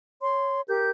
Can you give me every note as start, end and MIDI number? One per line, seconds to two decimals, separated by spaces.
0.21 0.61 73
0.21 0.61 84
0.67 0.91 67
0.67 0.91 70
0.67 0.91 91